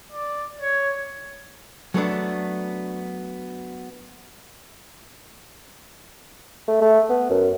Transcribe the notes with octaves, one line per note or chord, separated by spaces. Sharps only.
D5
C#5
F#3 A3 B3 D4
A3
A3
B3
F#2